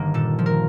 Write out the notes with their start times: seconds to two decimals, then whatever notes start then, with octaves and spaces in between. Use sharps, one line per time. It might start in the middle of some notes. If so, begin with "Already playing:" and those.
Already playing: G1 D#3 A#3
0.14 A#2 A4
0.39 F3
0.46 A#4